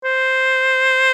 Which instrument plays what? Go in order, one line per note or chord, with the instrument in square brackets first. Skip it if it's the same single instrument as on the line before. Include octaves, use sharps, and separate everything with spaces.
[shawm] C5